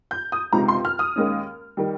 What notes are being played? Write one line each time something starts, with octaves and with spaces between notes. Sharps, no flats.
G6
D#6
C#2 C3 F3 G#3 D#4 A#5
C6
F6
D#6
D#2 D#3 G#3 C#4
D#3 G3